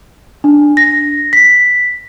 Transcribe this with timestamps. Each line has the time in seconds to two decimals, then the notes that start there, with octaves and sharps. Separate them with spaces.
0.44 D4
0.77 A#6
1.33 B6